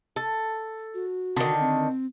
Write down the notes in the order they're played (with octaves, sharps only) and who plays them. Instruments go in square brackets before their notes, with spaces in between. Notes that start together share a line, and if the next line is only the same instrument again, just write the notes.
[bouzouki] A4
[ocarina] F#4
[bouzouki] D3 D#3
[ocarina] C4